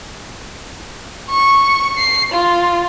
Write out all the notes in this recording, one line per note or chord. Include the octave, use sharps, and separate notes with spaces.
C#6
C7
F4